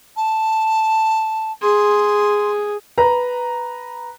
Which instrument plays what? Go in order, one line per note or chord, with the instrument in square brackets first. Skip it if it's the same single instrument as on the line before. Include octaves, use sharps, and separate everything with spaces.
[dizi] A5
[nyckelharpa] G#4 [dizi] C6
[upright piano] B4 A#5